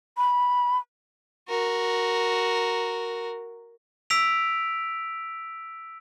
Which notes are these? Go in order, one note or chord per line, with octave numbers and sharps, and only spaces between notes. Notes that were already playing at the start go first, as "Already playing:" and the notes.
B5
F#4 A#4
E6 B6 D7 F7